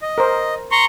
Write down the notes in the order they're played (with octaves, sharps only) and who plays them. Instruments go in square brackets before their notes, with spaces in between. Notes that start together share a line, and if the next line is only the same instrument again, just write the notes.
[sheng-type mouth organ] D#5
[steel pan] A#4 C5
[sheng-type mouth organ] A#5 C6 C#6